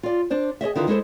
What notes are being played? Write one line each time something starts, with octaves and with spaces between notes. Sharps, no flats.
F4 D5
D4 C5 D5
G#4 C#5 D#5 E5
D3 D#3 E4 F4 B4
G#3 E4 A4 C5